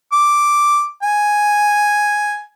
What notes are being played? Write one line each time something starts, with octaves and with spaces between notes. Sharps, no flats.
D6
G#5